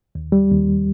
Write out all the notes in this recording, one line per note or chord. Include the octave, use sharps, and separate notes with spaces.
D#2
G3
D#2